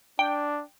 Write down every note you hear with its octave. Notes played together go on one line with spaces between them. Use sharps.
D4 G5